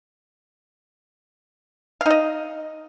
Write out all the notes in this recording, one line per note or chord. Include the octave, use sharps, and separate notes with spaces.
D#4 D#5 F5